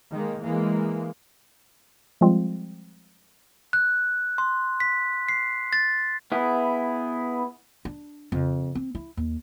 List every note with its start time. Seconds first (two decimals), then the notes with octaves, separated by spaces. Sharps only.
0.12 D#3 G#3 A#3
0.43 E3 G#3 A#3
2.21 F3 G3 G#3 C4 F4
3.73 F#6
4.38 C6
4.80 B6
5.29 C7
5.73 A6
6.32 B3 E4 G#4
7.85 D4
8.32 F2 C#3
8.75 C4
8.95 E4
9.17 D#2